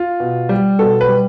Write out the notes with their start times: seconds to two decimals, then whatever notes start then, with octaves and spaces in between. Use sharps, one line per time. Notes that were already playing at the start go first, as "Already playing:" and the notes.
Already playing: F4
0.20 B2
0.49 G3
0.79 B2 A4
1.01 B4
1.08 G3